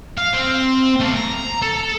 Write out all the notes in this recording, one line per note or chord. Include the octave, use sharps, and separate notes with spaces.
F5
C4
A3 F5
A#5
A4